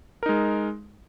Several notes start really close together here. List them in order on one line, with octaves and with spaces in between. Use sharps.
A#4 D#4 G#3